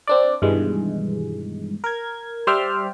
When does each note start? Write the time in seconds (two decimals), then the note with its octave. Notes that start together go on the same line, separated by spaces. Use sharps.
0.07 C4 D4 D5
0.42 G2 B2 D#3 E3 G#3
1.84 A#4 G#6
2.47 G3 C5 D5 E5 G5 F6